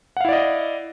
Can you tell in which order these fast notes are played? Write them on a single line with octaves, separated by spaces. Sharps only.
F#5 F5 E4 D5 D#5